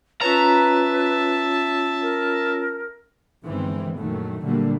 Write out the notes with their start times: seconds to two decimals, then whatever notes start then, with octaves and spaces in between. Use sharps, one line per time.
0.21 C#4 F4 B4 C#5 E5 A5 A#5
2.02 A#4
3.44 G1 D#3 E3 G#3 C4
3.97 A#1 F#2 D#3 F#3 A3
4.43 A#2 D3 F#3 G3 A3 A#3